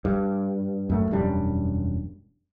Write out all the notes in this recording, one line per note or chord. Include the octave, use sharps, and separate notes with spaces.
G2
F#2 A3
E1 F#2 G3 D4